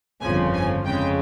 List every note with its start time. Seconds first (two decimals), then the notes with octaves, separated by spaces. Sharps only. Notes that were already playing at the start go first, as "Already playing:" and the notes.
0.21 G1 F2 C#3 F3 G#5
0.54 G#5
0.85 F2 C#3 G#3 G5